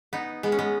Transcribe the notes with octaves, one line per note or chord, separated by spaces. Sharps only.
B3 D#4
G#3 B3
C#4
G#3 B3